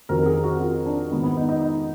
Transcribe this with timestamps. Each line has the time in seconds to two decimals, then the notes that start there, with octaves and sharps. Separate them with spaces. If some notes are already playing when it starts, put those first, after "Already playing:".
0.09 F2 D#3 F#3 A#4
0.26 G#4
0.44 F#4
0.60 F4
0.86 D4
1.11 G#2 D#3 F#3 B3
1.23 B3
1.37 D#4
1.49 D#4
1.62 D#4